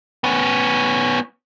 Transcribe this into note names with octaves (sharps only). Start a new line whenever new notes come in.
B3 C#4